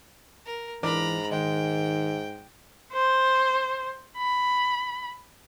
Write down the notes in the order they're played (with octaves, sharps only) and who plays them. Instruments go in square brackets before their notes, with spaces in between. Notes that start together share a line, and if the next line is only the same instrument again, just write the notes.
[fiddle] A#4
[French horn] G#2 [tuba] E3 [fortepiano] D4 A#4 D5 [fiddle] A#5 B5
[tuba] D#3 [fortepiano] G#3 [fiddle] G5
[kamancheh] C5
B5